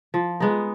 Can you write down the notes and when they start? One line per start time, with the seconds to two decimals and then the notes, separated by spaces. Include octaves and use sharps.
0.14 F3
0.40 G#3 B3 D#4